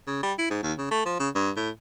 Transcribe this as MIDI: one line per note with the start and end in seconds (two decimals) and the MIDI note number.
0.07 0.21 49
0.23 0.33 55
0.38 0.47 64
0.50 0.63 44
0.63 0.73 39
0.78 0.91 49
0.91 1.03 57
1.05 1.16 53
1.20 1.29 49
1.35 1.51 43
1.56 1.69 45